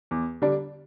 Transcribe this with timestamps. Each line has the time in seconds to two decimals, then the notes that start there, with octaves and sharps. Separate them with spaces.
0.11 E2
0.42 D3 G3 D4